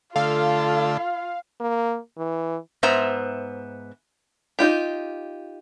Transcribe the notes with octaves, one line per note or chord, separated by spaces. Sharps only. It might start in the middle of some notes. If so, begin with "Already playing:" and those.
D3 A3 F4 A4 F5
A#3
E3
G#2 B3 C5 E5 A#5
D#4 F4 G4